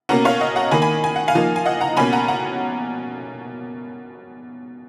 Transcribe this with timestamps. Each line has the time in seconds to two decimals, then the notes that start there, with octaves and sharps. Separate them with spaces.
0.09 B2 A#3 C#4 F#5 A#5
0.25 C#5 F5
0.40 D#5 F#5
0.56 F#5 A#5
0.71 D#3 A#3 D#4 G#5 B5
0.82 G#5 B5
1.04 G#5
1.16 F#5
1.28 F5 G#5
1.35 F3 A#3 D#4
1.56 G#5
1.66 D#5 F#5
1.81 F#5 A#5
1.97 B2 A#3 C#4 G#5 B5
2.12 F#5 A#5
2.28 F#5 A#5